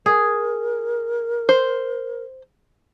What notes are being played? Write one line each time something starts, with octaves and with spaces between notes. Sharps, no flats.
G#4 A#4
C5